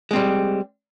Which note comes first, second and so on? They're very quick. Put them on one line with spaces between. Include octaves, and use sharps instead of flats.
G#3 C4 G3